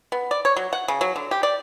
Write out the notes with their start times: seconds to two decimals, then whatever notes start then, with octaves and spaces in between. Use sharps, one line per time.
0.12 B3
0.31 D5
0.45 C#5
0.56 F#3
0.73 F#5
0.88 C#3
1.01 F#3
1.16 D3
1.31 G4
1.43 D5